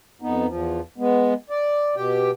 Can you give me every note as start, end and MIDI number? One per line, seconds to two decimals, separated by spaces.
0.22 0.47 41
0.22 0.47 59
0.22 0.47 63
0.47 0.80 40
0.47 0.80 53
0.98 1.34 56
0.98 1.34 59
1.50 1.95 74
1.96 2.31 47
1.96 2.31 67
1.96 2.31 79